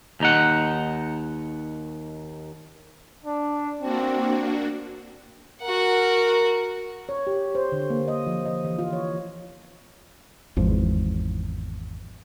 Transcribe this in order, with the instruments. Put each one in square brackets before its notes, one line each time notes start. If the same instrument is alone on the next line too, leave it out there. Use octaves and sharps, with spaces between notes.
[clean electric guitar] D#2 D#4 F#5
[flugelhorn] D4
[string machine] A#3 D4 F#4 [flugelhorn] C4
[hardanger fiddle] F#4 F#5 [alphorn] A#4
[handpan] C#5
G4
C5
D3
A#3
D#5
F3
D#5
E3
F4
C#5
[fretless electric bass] G#1 E2 F3